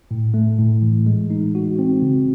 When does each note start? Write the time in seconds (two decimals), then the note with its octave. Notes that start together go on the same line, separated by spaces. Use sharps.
0.11 A2
0.34 A3
0.59 A2
0.82 E3
1.06 G#3
1.30 D#4
1.55 F#4
1.79 C4
2.02 C#3